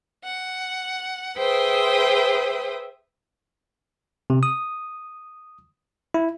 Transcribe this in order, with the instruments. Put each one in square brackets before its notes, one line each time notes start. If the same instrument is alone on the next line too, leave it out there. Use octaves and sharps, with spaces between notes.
[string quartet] F#5
G#4 B4 C5 E5 G5 D#6
[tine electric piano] C3
D#6
E4